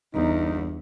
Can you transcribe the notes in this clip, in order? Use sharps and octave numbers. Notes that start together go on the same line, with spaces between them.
G1 E2 D#4